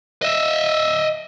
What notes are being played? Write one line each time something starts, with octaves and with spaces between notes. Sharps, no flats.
D#5 E5